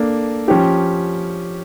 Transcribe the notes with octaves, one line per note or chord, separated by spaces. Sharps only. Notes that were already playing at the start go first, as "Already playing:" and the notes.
Already playing: A#3 D4 A4
F3 C#4 G4